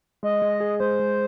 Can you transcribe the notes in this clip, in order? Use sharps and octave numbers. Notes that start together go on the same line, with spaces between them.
G#3 D#5
G#3
G#4
G#3 C5
G#3